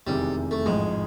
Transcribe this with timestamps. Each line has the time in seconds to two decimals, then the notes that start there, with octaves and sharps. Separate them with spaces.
0.06 F1 E2 C3 D#3 G3 G#3
0.51 A3
0.66 A1 G#2 F3 G#3